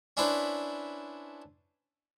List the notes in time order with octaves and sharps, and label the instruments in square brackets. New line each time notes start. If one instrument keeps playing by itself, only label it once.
[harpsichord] C#4 D4 E4 B4 C5